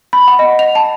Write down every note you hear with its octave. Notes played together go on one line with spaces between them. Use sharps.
B5
F#5
D#5
F7
A5